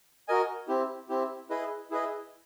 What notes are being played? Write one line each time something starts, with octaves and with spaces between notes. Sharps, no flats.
F#4 A#4 D#5 G#5
C4 E4 G4
C4 E4 G4
E4 G#4 B4 D#5
E4 G#4 B4 D#5